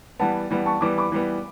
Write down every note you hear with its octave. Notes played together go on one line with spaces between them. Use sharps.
E3 G3 B3 F#5 A5
E3 G3 B3
A5 C#6
E3 G3 B3 D6
B5 D6
E3 G3 B3